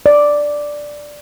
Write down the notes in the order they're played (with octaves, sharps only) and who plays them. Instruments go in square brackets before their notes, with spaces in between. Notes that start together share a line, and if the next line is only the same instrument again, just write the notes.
[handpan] D5